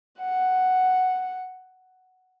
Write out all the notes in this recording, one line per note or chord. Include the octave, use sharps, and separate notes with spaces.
F#5